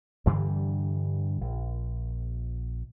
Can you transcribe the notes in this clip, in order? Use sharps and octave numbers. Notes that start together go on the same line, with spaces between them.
G2 D3 E3 G3
A#1